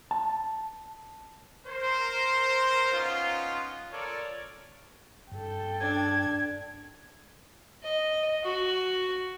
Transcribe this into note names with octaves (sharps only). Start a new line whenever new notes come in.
A5
A#4 C5
B3 C#4 D#4 F4
F4 A4 A#4 C#5 D5
G2 A4 G5
D4 G#6
D#5
F#4